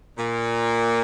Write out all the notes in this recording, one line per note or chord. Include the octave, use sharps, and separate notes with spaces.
A#2